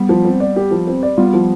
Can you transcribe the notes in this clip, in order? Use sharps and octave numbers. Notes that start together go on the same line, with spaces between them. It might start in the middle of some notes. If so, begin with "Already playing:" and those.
Already playing: G3 B3
F3
C4
D5
G4
F3
C4
D5
G3 B3 F4
F3